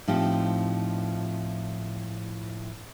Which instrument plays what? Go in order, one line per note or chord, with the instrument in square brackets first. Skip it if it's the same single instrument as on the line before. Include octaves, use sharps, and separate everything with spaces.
[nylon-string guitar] A2 F3 C4 D#4 F4 G4